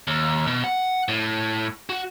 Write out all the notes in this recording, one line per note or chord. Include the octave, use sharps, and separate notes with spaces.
D#2
B2
F#5
A2
F#4